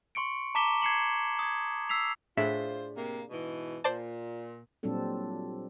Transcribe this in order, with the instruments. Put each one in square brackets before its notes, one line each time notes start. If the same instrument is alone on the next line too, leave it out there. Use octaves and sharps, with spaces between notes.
[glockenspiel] C6 C#6 C#7 D7
A5 A#5 D6 B6 E7 G7
G#6 C7 C#7 E7 F#7
D#6 G#6
E6 B6 C7 F7
[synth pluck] A2 [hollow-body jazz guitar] D4 G#4 E5 [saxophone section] F4 C5
[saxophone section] C3 A#3
G#2 B2 E3
[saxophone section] A#2 [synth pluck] C5 D5 A5
[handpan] A#2 F#3 G3 C4 D4 A4